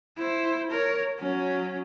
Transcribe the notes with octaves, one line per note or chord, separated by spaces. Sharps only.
E4 C5
A#4 C#5
F#3 C#4